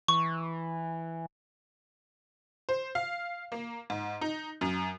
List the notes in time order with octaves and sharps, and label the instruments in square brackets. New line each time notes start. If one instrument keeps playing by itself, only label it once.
[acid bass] E3 [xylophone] C#6
[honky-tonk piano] C5
F5
A#3
G#2
D#4
F#2